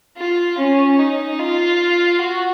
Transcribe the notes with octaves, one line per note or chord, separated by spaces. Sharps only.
F4
C#4
D#4
F4
F#4